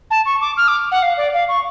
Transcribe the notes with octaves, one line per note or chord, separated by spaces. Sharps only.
A5
C#6
D6
F6
D6
F#5
F5
D5
F5
C#6